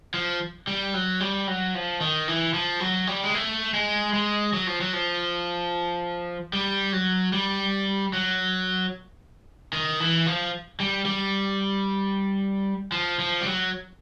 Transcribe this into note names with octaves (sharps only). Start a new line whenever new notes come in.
F3
G3
F#3
G3
F#3
F3
D#3
E3
F3
F#3
G3
G#3
A3
G#3
G#3
F#3
F3
F#3
F3
G3
F#3
G3
F#3
D#3
E3
F3
G3
G3
F3
F3
G3
F#3